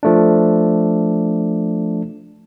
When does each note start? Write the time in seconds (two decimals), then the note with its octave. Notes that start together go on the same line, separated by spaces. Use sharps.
0.03 F3 A3 D4